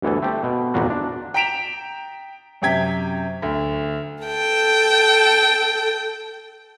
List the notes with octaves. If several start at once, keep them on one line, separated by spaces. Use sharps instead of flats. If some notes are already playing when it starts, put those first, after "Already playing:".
G1 D2 E3 A4 G#5
A3 C4 G4
B2
G#1 E2 A#2 F4 F#4
D4
G5 A#5 B6 D7 E7 F7
F#2 C3 G5 G#6 B6
D2
A4 G5